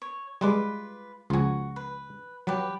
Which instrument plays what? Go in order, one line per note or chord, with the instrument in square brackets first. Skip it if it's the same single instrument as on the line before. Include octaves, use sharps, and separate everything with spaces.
[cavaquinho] C#5
[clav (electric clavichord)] G3 G#3 [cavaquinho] F4 B4 D6
[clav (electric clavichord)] C#2 F3 G#5 [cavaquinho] F4 F#4
[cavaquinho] B4
[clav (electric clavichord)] F#3 [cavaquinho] G4 B4 A5